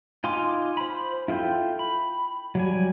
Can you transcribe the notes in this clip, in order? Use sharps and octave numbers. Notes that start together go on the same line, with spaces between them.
D#4 F4 G#5 C6 D6
C5 B5
E4 F4 A4 G5
B5
F#3 G3 G#5